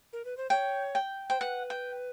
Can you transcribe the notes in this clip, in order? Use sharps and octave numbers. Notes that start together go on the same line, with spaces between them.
A#4
B4
C5
C#5 G5
G5
C5 G5
B4 F#5
G5